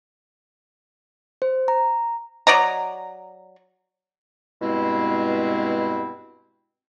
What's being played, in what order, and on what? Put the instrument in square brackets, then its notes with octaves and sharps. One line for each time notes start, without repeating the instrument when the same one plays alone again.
[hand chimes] C5
A#5
[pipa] F#3 D5 D#5 A#5
[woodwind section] G2 B2 G#3 C4 E4